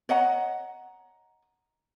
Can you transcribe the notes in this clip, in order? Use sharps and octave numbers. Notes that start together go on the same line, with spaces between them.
C#5 D#5 F#5 A#5